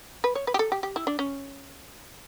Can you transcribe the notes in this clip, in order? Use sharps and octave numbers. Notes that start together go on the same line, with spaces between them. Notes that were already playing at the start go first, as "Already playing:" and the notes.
B4
C#5
B4
G4
A4
G4
G4
E4
D4
C#4